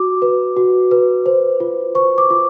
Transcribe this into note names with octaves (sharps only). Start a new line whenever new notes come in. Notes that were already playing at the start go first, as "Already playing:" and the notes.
Already playing: F#4 D6
B4
F#4
B4
C5
F4
C5 C#6
D6
F4